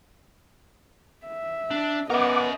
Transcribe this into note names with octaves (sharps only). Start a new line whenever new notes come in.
E5
D4
B3 C#4 A#4 D#5 E5 F#5 D6